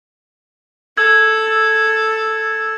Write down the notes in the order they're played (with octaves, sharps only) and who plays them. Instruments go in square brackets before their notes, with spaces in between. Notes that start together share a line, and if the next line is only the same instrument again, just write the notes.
[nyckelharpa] A4 [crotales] E6 G#6